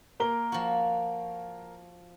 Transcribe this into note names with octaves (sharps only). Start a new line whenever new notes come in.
A#3 A#4 G7
F3 F#4